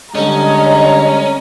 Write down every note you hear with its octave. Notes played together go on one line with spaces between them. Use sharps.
D3 G3 G#3 C#4 D#5 A#5